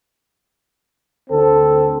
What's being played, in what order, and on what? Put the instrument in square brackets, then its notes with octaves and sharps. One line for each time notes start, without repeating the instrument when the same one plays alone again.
[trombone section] D2 D3 C4 A4